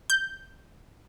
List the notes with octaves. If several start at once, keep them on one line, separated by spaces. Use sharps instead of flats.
G6